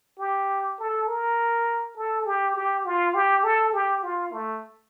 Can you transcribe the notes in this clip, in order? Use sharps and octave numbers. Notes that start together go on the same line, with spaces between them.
G4
A4
A#4
A4
G4
G4
F4
G4
A4
G4
F4
A3